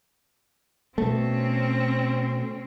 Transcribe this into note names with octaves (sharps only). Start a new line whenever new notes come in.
B2 A3 C4 C#4